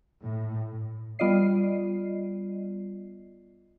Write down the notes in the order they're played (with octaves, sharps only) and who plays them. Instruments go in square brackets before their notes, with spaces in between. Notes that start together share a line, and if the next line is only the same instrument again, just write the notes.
[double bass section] A2
[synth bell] G3 B3 F4 D5 D#5 C7